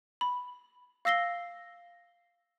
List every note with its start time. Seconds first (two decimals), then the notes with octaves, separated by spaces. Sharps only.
0.21 B5
1.05 F5 E6 A#6 C7 G7